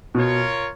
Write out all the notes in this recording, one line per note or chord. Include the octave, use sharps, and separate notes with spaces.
B2 F4 A#4 C#5